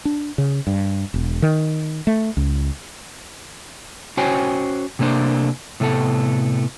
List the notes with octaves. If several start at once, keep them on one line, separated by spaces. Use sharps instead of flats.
D4
C#3
G2
E1
D#3
A3
C#2
C#4 F#4 C5 C#5 G5 G#5
C3 A3 A#3 D4 C5
A2 C3 A3 B3 A4